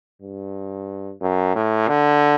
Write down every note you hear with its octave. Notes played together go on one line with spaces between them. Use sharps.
G2
F#2
A2
D3